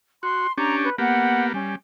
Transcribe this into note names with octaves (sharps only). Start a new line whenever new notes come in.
F#4 C6
C#4 D4 G4 A#5
B4
A#3 B3 G4 F#5
G3 C#4